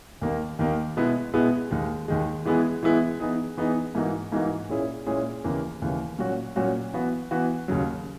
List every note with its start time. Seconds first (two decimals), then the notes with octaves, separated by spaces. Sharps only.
0.21 D#2 D#3 A#3
0.59 D#2 D#3 A#3
0.97 B2 G#3 B3 E4 G#4
1.34 B2 G#3 B3 E4 G#4
1.71 D#2 D#3 G#3
2.08 D#2 D#3 G#3
2.45 E3 G#3 B3 E4 G#4
2.83 E3 G#3 B3 E4 G#4
3.20 E3 B3 D#4 G#4
3.57 E3 B3 D#4 G#4
3.95 G#2 E3 A#3 D#4 F#4
4.32 G#2 E3 A#3 D#4 F#4
4.69 A#2 G#3 C#4 E4 G#4
5.06 A#2 G#3 C#4 E4 G#4
5.44 D#2 C#3 E3 A#3
5.82 D#2 C#3 E3 A#3
6.18 A#2 F#3 C#4 F#4
6.56 A#2 F#3 C#4 F#4
6.93 E3 B3 F#4
7.31 E3 B3 F#4
7.68 D#2 C#3 F#3